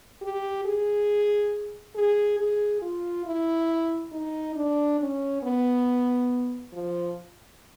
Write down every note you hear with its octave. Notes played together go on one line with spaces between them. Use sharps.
G4
G#4
G#4
G#4
F4
E4
D#4
D4
C#4
B3
F3